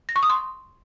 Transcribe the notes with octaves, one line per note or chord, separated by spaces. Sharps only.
A#6
C#6
D#6
C6